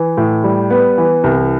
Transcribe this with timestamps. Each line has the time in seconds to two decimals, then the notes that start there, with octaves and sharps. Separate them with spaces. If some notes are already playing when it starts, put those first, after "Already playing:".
Already playing: E3
0.17 A2
0.44 G3
0.70 B3
0.98 E3
1.24 C2